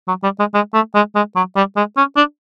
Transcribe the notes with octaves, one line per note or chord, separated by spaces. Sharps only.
F#3
G3
G#3
G#3
A3
G#3
G#3
F#3
G3
G#3
C#4
D4